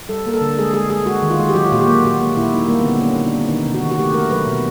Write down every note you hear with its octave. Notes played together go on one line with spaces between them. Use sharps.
G3 A4
A#3 A#4
A4
D3
G#3 G#4
G#3 G#4
G#3 G#4
G#3 F#4
D#3
F4
G#3
G4
F#3 F#4
F4
A#2 F#4
G4
A#3
A#2 F#4
A#3
A#2 E4
A#3 D#4
G3 A#3
D3 B3
C4
A#3 C#4
D3 D#4
D4
D3
D#3 D#4
C3
F#4
D#3
F#4
A3 G4
A3 A#4
F#3 B4
B2